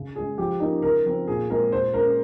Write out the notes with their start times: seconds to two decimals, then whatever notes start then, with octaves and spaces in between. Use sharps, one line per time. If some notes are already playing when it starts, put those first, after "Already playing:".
Already playing: C#3
0.16 G#3 C#4 G#4
0.38 F3 G4
0.60 A#3 C#4 D#4
0.82 C#3 A#4
1.05 F3 C4
1.27 A#2 G#4
1.49 G#3 C4 A#4
1.72 A#2 C5
1.94 G#3 C#4 A#4